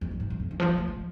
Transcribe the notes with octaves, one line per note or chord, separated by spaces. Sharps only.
F2
F#2
G#2
F#2
F2
D3
F3
F#3
A3
G#3